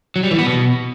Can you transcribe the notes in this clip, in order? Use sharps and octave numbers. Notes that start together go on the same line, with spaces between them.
F#3
G3
E3
B3
B2